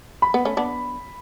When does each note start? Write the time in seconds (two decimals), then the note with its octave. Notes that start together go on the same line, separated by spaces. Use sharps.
0.22 B5
0.34 B3
0.45 A3 C#4
0.57 B3 D4